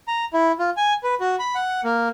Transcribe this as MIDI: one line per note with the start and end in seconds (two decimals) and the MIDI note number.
0.08 0.25 82
0.34 0.52 64
0.59 0.70 65
0.77 0.94 80
1.03 1.15 71
1.20 1.36 66
1.39 1.55 83
1.55 1.81 78
1.84 2.08 58